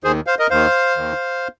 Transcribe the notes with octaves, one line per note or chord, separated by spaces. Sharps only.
D#2 D#3 G#4 C5
C5 F5
A#4 D#5
D#2 D#3 C5 F5
D#2 D#3